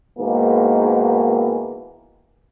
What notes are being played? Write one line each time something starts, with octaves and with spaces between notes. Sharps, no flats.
G#2 B2 D#3 E3 A#3